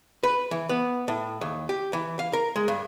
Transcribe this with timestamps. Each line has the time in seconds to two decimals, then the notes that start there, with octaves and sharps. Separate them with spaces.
0.23 B4
0.51 E3
0.69 B3
1.08 A2
1.41 D#2
1.69 G4
1.93 E3
2.19 F5
2.33 A#4
2.56 G#3
2.68 G2